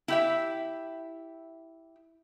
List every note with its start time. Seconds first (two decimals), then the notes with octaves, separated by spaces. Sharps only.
0.08 E4 G4 E5